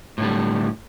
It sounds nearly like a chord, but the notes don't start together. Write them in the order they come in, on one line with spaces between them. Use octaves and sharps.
A2 D3 G3